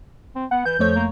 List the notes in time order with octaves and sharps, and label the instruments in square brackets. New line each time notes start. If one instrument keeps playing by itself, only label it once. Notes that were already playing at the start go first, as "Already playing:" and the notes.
[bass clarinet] C4
[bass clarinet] B3 [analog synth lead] F#5
[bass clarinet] E3 [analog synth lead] G6
[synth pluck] F2 A3 C#5 [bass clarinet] F3
[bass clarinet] A#3